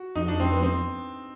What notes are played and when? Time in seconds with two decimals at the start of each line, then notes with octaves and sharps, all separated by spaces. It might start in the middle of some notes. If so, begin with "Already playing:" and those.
Already playing: F#4
0.15 F2 D#4
0.28 D4
0.40 C4
0.52 B3
0.63 C4